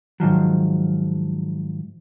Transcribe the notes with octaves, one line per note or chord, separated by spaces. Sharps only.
G#2 D#3 F3 F#3